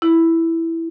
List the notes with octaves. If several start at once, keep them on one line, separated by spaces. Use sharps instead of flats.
E4